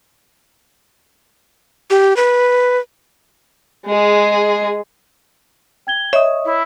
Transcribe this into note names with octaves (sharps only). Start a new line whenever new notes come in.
G4
B4
G#3 G#4
G5 G#6 G7
C#5 D#5 E5 D#6
E4